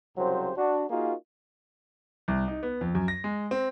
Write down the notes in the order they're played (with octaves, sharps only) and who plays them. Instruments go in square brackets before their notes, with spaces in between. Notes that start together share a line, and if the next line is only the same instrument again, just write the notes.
[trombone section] C2 C#3 F#3 G4 C5
D4 F#4
A#3 D#4 F4 F#4 G#4 A#4
[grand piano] C2
D#4
B3
F2
F#2
A#6
G#3
C4